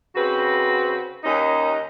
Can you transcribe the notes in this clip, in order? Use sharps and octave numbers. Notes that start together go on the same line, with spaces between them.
C#3 C4 F#4 B4
D#2 C#4 D#4 D#5